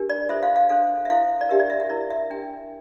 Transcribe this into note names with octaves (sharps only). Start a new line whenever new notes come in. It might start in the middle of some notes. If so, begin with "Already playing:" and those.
Already playing: D4 G4 A#4
D5
F4 A4 C5 E5
F5
F5
D4 A4 C5 F5
E5
E4 A4 C5 F5
D5
D4 G4 A#4 E5
D5
E5
E5
E4 A#4 D5
E5
D4 G4 A#4 G5